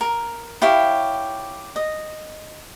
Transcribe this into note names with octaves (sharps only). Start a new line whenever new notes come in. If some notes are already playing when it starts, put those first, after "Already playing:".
A#4
E4 G4 C#5 F5
D#5